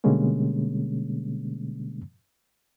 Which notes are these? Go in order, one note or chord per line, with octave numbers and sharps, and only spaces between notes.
B2 D3 G3 G#3 A#3 C#4